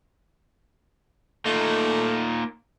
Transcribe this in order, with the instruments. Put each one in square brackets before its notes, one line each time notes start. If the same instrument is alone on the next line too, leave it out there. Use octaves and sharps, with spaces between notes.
[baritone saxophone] A3 [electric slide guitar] A#3 D#4 F4